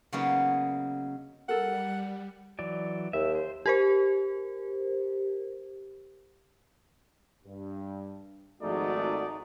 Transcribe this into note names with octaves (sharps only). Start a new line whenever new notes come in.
C#3 F#3 A#3 B3 C#4 D#4
G3 A4 A#4 F#5
E3 F#3 D5
D#2 E5
C5
G4 A#4 C5
G2
G#1 F3 G#3 A3 D#4 F#4 D5